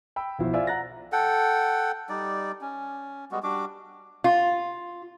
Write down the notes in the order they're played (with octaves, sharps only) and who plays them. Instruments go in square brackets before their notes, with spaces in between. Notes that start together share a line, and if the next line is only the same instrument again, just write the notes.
[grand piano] G5 B5 E6
B1 F3 E4 F#4 C5
F4 C5 D5 E5 G#5 E6
F#5 A#5 F#6 A6 A#6
[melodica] A4 F#5 G5
G3 D#4 D5
C#4
G3 G#3 B3 F#4
G3 D4 F#4 D6
[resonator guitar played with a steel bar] F4